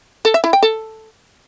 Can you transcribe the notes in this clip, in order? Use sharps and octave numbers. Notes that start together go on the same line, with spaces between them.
A4
E5
E4
G5
A4